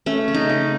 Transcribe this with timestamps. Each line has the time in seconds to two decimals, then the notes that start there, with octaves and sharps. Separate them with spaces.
0.06 A3 C#4
0.28 C#3
0.34 D#4
0.49 C#3